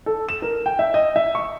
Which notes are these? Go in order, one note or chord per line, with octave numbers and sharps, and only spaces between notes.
A4
E7
A#4
G5
E5
D#5
E5
C#6